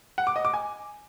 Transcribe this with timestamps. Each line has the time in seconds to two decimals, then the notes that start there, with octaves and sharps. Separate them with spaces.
0.18 F#5
0.27 D6
0.36 D#5
0.45 D6
0.54 G#5